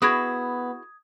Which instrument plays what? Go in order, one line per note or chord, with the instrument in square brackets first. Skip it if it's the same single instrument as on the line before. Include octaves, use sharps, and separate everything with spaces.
[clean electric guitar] B3 [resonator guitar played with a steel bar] E4 F#4 G#4 [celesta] D#6 G#6